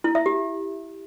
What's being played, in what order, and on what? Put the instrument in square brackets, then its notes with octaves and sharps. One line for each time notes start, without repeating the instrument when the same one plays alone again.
[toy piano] E4
E5
G4